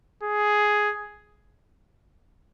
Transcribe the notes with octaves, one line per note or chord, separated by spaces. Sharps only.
G#4